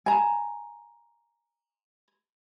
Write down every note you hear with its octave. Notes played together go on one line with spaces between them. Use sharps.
G#5 A#5